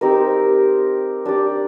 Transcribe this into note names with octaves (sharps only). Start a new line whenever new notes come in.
C4 D#4 G4 A#4
D4 G4 D5